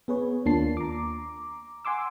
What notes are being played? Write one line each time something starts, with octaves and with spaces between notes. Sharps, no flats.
B3 G#4 B4 C#5
D#2 A#3 D4 F4 A5 C7
A#5 D6
F#5 G#5 C6 D6 E6